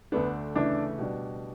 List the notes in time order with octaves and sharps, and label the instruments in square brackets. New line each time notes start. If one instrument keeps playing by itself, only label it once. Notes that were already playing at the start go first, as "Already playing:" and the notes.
[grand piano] D2 D3 A3 D4 [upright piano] B3
[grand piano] C#3 E3 A3 E4 [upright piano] D4
[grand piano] B2 G3 D4